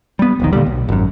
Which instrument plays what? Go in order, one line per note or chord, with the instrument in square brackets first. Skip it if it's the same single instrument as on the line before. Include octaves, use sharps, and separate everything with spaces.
[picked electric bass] G3 B3
D#1 A#1 D#3
A#2 D3 F#3 G3
B1
G#1 F#2